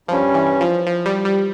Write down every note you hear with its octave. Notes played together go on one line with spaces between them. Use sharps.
G2 F3 G3 C#4
E3
F3
F3
G3
G3